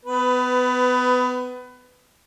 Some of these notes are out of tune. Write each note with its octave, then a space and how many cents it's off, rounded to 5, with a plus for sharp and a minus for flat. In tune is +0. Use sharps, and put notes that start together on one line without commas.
B3 +30 B4 +15